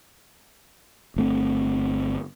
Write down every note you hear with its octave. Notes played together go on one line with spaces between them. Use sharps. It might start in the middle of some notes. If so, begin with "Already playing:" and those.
G1 A3 C4